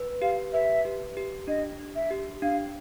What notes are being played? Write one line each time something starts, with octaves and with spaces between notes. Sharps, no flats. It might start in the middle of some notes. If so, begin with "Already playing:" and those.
Already playing: B4
G4 F5
B4 E5
G4
G4
D4 D#5
D4
E5
G4
D4 F5